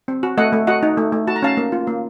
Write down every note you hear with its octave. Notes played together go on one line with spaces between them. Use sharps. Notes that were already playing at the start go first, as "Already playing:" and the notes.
C4
F#4
A3 D#5 F#5
A3
F#4 D#5 F#5
D#4
A3
A3
F#4 A5
A#5
C#4 F5 A5
A#3
F4
A#3